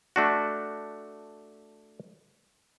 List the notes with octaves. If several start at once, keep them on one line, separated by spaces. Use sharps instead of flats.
A3 D4 F#4